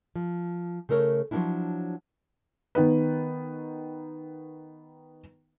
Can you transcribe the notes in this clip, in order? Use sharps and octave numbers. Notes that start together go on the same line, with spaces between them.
F3
C#3 A3 A4 A#4 C#5
F3 F#3 A#3 C#4 D4 E4
D#3 B3 B4